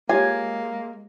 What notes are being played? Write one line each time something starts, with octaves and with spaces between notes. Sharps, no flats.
G#3 A#3 F4 G4 C#5 G#5